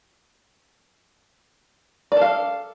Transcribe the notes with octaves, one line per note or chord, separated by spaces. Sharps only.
A4 D5 F5